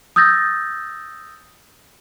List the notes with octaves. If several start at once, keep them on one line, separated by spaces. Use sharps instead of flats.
D#6 E6 G6 A6 A#6